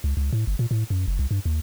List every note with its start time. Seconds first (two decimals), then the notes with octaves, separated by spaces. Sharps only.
0.04 C#2
0.17 C#2
0.33 A2
0.47 G1
0.59 A#2
0.71 A2
0.90 F#2
1.08 F#1
1.19 C2
1.31 G2
1.45 D#2